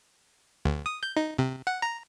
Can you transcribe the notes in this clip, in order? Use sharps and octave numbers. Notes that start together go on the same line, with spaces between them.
D2
D#6
G6
D#4
C3
F#5
A#5